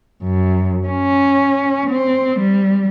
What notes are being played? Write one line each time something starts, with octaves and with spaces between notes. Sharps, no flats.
F#2
C#4
C4
G3